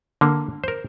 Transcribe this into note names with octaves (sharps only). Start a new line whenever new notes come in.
D3 A#3
A#4 C5